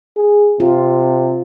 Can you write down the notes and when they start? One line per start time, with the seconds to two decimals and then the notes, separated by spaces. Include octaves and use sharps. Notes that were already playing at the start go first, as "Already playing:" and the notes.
0.16 G#4
0.60 C3 F4